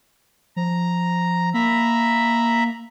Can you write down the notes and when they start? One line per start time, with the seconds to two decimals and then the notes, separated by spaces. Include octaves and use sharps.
0.56 F3 A#5
1.54 A#3 E5 A#5 B5